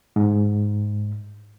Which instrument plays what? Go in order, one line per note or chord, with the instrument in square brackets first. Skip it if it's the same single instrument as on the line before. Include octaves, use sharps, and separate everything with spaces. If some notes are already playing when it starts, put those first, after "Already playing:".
[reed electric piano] G#2